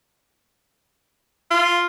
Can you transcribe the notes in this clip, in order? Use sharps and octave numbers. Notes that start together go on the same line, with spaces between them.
F4